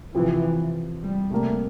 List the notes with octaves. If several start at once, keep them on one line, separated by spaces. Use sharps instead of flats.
C3 E3 F3 C4
G3
C3 G3 A3 A#3